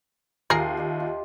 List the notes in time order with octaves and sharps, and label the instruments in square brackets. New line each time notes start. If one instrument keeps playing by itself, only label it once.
[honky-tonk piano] D#2 C7 [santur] F4 G4 E5 [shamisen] G#4 A#4
[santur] G4 D#5 E5
F4